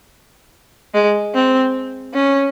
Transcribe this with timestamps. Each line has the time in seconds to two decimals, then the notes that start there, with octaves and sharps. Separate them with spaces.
0.94 G#3
1.35 C4
2.14 C#4